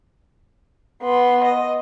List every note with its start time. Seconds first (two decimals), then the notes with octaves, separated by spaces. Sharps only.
1.02 B3 C6
1.44 D#5